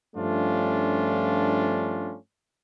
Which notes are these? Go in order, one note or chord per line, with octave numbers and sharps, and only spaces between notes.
G2 F3 A3 C#4 D4 F4